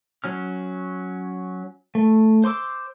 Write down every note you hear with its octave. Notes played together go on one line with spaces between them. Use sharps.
F#3 C#4 F6
A3
C5 C6 D6 E6